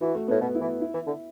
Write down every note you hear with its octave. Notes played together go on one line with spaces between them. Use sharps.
E3 F#4
A3
A2 B3
B2 B3
E4
E3
E4
E3
D3